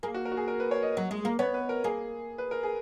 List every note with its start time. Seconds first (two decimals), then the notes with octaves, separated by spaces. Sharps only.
0.03 A#3 G#4
0.14 F#4
0.25 A#4
0.32 F#4
0.37 G#4
0.48 A#4
0.60 B4
0.71 C#5
0.83 D#5
0.97 F#3
1.11 G#3
1.25 A#3
1.39 B3 C#5
1.54 B4
1.69 A#4
1.84 A#3 G#4
2.38 B4
2.51 A#4
2.63 G#4